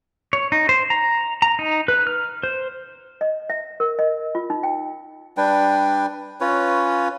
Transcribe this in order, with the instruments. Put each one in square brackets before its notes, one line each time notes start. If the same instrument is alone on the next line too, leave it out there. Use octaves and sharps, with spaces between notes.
[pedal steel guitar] C#5
D#4
C5
A#5
A#5
D#4
B4
F6
C5
[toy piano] D#5
E5
A#4
D#5
F4
D#4
G5
[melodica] G3 D4 B4 G5
C#4 F4 B4 C#5